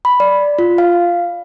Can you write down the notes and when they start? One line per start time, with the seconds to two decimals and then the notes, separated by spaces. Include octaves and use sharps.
0.05 B5
0.20 D5
0.59 F4
0.78 F5